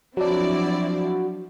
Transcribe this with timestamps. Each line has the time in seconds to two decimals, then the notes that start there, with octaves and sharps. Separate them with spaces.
0.17 F3 F#3 C4 D4 E4 F#4 D5